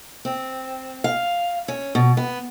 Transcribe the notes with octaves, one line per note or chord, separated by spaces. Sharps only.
C4
F5
C#4
B2
B3